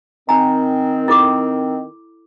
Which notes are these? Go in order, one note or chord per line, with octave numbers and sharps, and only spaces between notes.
D#3 C4 G#5 A#5
E4 A4 D6